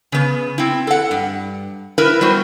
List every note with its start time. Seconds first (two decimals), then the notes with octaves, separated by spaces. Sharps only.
0.12 C#3 B3
0.58 C4 E4
0.87 A4 F#5
1.11 G2
1.98 E4 A#4 B4
2.21 G3 B3 F#4 C5